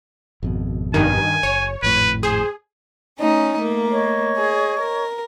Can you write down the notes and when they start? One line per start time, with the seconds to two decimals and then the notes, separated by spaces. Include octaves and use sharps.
0.43 G#1 F2 B2
0.94 G2 D#3 G#5
1.43 F#1 C#5
1.82 G#1 F2 A2 B4
2.23 G#4 C5
3.19 A3 C#4 D#4
3.57 A3 A#3
3.92 C#5 D#5 C#6
4.35 G#4
4.78 A#4